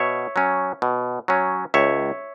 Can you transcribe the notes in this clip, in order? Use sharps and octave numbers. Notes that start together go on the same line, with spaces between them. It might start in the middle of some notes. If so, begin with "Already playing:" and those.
Already playing: B2 C#5 E5
F#3 C#4
B2
F#3 C#4
C#2 C#5 E5